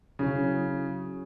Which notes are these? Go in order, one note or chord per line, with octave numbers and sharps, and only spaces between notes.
C#3 F#3 C#4 E4